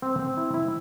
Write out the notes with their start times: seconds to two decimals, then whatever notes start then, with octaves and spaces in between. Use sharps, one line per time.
0.02 C4
0.19 C4
0.37 E4
0.54 E4